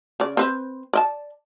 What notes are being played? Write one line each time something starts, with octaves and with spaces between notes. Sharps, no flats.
C#3 D5
C4 B4 C5
D5 D#5 A5